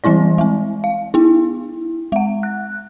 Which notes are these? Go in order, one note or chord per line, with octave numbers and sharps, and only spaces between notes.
E3 G3 C4 E4 D5
G#3 C4
F5
B3 E4
G#3 F#5
F#6